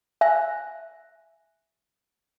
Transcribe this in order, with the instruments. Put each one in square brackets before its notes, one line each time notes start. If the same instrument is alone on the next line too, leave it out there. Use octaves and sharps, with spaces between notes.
[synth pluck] E5 G#5 F#6 A#6